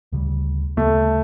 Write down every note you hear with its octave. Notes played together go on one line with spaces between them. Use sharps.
D2 C#3 E3 G3
D2 C#3 E3 G3 A3